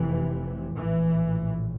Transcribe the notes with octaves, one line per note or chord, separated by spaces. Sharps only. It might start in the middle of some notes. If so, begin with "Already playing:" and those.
Already playing: F1 F2 C3 E3
A#1 A2 E3